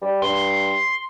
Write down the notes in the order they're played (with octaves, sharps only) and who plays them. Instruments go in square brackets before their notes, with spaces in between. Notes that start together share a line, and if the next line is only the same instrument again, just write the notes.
[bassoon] G3
[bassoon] G2 [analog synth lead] C6